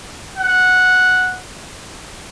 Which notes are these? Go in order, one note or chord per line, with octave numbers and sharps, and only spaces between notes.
F#5